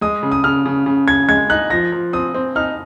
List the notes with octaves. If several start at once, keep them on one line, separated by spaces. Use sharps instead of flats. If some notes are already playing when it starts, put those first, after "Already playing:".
G#3 D#6
C#3
D#6
C#3 F6
C#3
C#3
C#3 G#6
G#3 G#6
D#4 F#6
F3 A#6
F3
C4 D#6
C4
D#4 F6